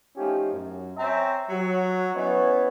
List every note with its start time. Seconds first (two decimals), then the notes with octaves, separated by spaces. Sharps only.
0.17 F3 A3 C#4 D#4 F4 G4
0.52 F#2
0.97 C4 C#5 E5 G5 G#5 A#5
1.49 F#3
2.15 E3 B3 C#4 C#5 D#5 E5